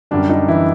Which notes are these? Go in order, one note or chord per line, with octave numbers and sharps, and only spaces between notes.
F#2 D3 G3 D4
D#4
E3 E4